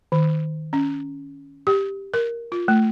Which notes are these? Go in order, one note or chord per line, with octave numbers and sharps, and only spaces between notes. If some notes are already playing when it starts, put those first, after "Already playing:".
D#3
C#4
G4
A#4
F4
A3